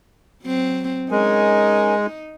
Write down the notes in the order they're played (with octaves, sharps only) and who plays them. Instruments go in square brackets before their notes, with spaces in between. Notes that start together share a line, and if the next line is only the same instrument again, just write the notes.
[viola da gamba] F#3 C4
[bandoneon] G#3 [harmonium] C#4 A#4 G#5 [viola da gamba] D#4